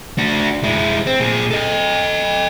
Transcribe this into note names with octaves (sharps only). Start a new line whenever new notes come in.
D4 F#4
G#3 E4
C4
A#2 G#4
A4 D#5